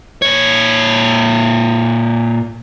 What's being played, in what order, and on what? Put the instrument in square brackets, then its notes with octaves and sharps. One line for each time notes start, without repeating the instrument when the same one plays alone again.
[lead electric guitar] A#2 C#5